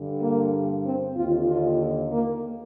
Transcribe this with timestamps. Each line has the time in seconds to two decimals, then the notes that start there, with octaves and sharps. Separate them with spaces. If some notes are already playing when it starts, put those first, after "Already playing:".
Already playing: G2 D3
0.22 A#3
0.85 C4
1.17 D#2 D3 F4
1.49 F4
2.12 A#3